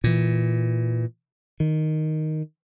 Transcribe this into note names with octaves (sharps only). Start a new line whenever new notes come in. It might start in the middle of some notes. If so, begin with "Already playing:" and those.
A#2 E3
D#3